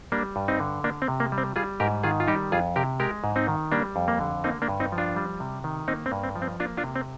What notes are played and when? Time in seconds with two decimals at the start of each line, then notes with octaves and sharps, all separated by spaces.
0.12 G3 A#3 D4
0.36 G2
0.48 C4 D#4
0.60 D3
0.84 A#3 D4
1.02 C4
1.08 C3
1.20 A#3
1.32 G3
1.38 C4
1.56 G3 F4 G#4
1.80 G#2 G4 A#4
2.04 D#3 F4 G#4
2.20 F4
2.27 G3 D#4 G4
2.52 F2 F4 G#4
2.76 C3 G4 A#4
3.00 G#3 G4 A#4
3.24 G#2
3.36 C4 D#4
3.48 D#3
3.72 G3 A#3 D4
3.96 F2
4.08 A#3
4.20 D3
4.44 A#3 C4 D#4
4.62 A#3 D4
4.68 G2
4.80 C4 D#4
4.92 F3
4.98 D4 F4
5.16 G3
5.40 C3
5.64 D#3
5.88 A#3 C4 D#4
6.06 C4
6.12 G2
6.23 C4
6.36 F3
6.42 C4
6.60 A#3 D4 F4
6.77 D4 F4
6.84 C3
6.96 C4